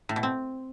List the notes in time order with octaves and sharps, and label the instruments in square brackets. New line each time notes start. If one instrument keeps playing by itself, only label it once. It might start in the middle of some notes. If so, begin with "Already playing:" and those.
[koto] A2
B2
C4